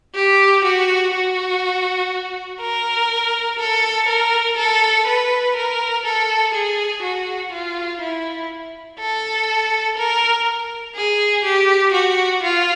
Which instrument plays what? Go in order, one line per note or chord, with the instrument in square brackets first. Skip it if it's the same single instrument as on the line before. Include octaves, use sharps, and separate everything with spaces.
[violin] G4
F#4
F#4
A#4
A4
A#4
A4
B4
A#4
A4
G#4
F#4
F4
E4
A4
A#4
G#4
G4
F#4
F4